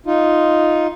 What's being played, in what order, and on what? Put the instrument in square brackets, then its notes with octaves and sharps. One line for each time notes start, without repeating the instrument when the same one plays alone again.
[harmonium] D#4 F4